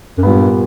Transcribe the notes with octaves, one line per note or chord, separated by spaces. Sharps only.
F#2
G2 A#2 G3 B3